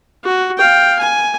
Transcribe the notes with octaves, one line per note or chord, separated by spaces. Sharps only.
F#4
F5 G5
G#5